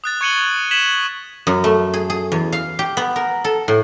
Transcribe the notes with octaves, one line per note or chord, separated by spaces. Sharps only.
D#6 F#6 A6
C#6 G#6 C#7 D#7 F#7 G7
G#6 B6 E7 F#7
F#2
A3
G#4
G#4
E2
F5
G4
B3
A#4
A4
A2